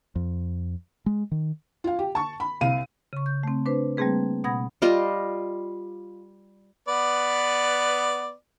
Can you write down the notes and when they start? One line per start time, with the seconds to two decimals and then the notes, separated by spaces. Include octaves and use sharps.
0.15 F2
1.06 G#3
1.31 D#3
1.84 F4 F5
1.99 G4
2.15 A5 C#6
2.40 B5
2.61 C2 C3 F5 D#7
3.13 C#3 C#6
3.26 G6
3.43 A3 C4
3.66 D4 B4 C5
3.97 G3 A3 A#3 C4 G#4 B4
4.44 B2 F#5 B5 D#6 G#6 A#6
4.82 G3 F4 D#5
6.88 B3 B4 D5